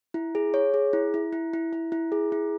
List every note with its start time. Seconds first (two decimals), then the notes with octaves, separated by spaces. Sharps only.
0.14 E4
0.35 G#4
0.54 C#5
0.74 G#4
0.93 E4
1.14 E4
1.33 E4
1.54 E4
1.73 E4
1.92 E4
2.12 G#4
2.32 E4